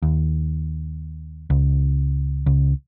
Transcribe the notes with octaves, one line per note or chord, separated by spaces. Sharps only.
D#2
C#2
C#2